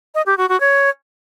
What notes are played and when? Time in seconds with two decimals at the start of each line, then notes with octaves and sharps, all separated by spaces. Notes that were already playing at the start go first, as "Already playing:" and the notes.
0.15 D#5
0.26 G4
0.38 F#4
0.49 F#4
0.60 C#5